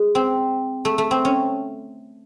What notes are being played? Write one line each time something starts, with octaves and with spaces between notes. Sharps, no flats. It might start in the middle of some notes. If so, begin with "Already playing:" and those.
Already playing: G#3
C4
A3
A3
C4
C#4